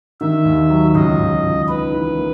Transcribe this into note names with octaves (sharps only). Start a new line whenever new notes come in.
D#3 E5
D#2
F#3
C#2 D#5
C#2
C#2
D#4 B4
E3
A#3